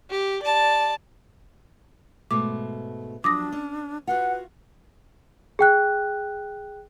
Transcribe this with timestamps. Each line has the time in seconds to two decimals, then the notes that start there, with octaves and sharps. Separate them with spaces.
0.10 G4
0.43 D5 A5
2.31 G#2 B2 A3 D6
3.24 F3 F#3 D4 D6 D#6 A#6
3.52 C#4
4.07 F4 F#4 B4 F#5
5.59 G#4 G5 F#6